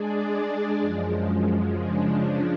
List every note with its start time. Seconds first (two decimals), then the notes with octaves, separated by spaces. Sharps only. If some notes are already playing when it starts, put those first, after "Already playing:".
Already playing: G#3 D4 G#4 D5
0.78 F#2 F3 G#3
1.74 C#3 F3 G#3 D4